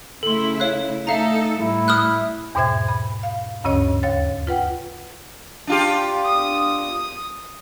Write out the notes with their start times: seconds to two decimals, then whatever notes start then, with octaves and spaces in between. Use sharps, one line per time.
0.23 C#3 A3 E4 A4 C6
0.60 C#5 F5 F#6
1.07 A3 D#4 A4 E5 F5 A#5
1.59 A2 G3 A3 E4
1.88 D#6 F6 F#6
2.55 E2 G#2 B2 C5 E5 G#6
2.88 B5
3.23 F5
3.64 D2 G2 C#3 C#4 C#5 D#5
4.03 D#2 C#5 F5 A6
4.47 F4 B4 F#5 G5
5.67 D4 F4 G4
6.25 D#6